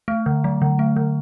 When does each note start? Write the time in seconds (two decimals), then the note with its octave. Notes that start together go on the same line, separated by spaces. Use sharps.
0.08 A3
0.26 D3
0.44 F#3
0.62 D3
0.79 A3
0.96 D3